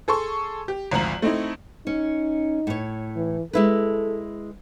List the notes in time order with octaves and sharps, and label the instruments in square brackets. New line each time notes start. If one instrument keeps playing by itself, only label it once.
[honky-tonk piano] G#4 A4 C6 C#6
G4
G#1 D2 F3 A#5 F#7
A3 C4 D#4 E4
[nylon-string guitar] C#4 [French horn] D#4
[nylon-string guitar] A2 C#5
[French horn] E3
[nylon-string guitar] G#3 E4 B4 [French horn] A4